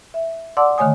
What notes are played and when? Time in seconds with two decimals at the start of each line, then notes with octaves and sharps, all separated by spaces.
0.14 E5
0.57 D5 F#5 A5 C6 D6 E6
0.78 D3 D#3 A3 C#5 G#5 D#6